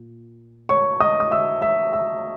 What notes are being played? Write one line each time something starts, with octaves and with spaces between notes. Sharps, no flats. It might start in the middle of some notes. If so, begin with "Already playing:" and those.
Already playing: A#2
C#5 C#6
D#5 D#6
D#6
E5 E6
E5 E6
E5 E6